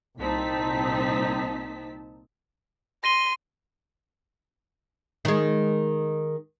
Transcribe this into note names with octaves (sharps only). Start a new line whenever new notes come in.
C2 A#2 C4 D#4 A5 B6
C6 A#6 D#7 G7
D#3 G#3